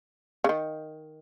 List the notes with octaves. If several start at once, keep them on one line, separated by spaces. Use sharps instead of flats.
C#3
D#3